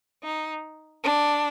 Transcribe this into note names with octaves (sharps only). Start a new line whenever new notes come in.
D#4
D4